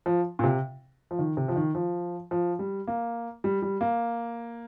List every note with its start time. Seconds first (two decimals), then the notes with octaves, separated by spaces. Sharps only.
0.06 F3
0.39 A#2
0.44 C3
1.11 F3
1.19 D#3
1.37 C3
1.48 F3
1.56 D#3
1.75 F3
2.31 F3
2.59 G3
2.88 A#3
3.44 G3
3.62 G3
3.81 A#3